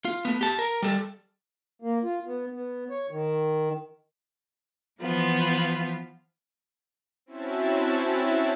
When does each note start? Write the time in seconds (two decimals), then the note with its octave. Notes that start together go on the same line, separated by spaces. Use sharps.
0.05 F4
0.25 A3 B3
0.41 G4 A5
0.59 A#4
0.82 G3 A4
1.82 A#3
2.03 F4
2.26 B3
2.54 B3
2.90 C#5
3.10 D#3
5.01 E3 F3 B3 F4
7.26 C4 C#4 E4 F#4 E5 A5